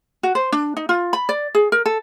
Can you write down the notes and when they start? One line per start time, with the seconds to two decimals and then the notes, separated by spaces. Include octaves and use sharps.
0.23 F#4
0.35 C5
0.52 D4
0.77 D#4
0.89 F4
1.13 B5
1.29 D5
1.55 G#4
1.72 A#4
1.86 A4